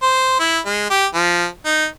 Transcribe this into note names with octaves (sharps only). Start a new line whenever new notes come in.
C5
E4
G#3
G4
F3
D#4